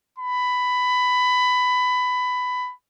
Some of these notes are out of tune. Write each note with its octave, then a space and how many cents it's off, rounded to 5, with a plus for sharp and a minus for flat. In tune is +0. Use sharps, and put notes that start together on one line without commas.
B5 +15